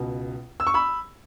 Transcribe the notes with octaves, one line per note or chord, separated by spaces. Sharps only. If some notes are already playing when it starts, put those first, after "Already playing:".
Already playing: C#2 B2
E6
C#6
B5 E6